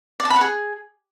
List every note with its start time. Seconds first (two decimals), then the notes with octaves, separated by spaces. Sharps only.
0.20 D5
0.25 A5
0.30 B5
0.36 F#5
0.41 G#4